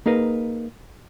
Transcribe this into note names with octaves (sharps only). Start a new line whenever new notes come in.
A#3 D#4 G#4 A#4 B4